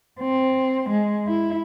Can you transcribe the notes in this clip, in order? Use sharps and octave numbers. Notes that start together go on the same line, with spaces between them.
C4
G#3
E4